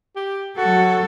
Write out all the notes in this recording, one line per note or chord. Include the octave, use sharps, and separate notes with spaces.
G4
F#3 F#4 A4